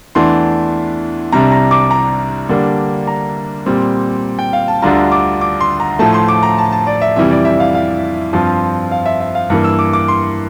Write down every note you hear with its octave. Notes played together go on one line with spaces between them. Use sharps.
E2 E3 A3 D4 C6
C2 C3 G3 D4 A#5
A#5
D6
A#5
D3 G3 A#3 D4
A#5
A#2 G3 C4
G5
F5
A5
D2 D3 G3 D4 F4 A#5
D6
D6
C6
A#5
A2 F3 A3 A5
C6
D6
A#5
A5
A5
D5
E5
F2 C3 E3 G3 E5
D5
E5
F5
F5
G2 F3 C4 F4
F5
E5
E5
F5
G2 E3 A#3
E6
D6
D6
C6